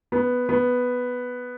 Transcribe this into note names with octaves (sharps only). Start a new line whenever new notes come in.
B3
B3